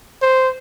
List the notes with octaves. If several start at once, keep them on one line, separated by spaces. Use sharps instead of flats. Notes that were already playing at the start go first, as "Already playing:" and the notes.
C5